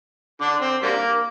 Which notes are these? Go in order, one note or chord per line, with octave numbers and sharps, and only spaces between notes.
D3 D4
C4
D3 G3 A#3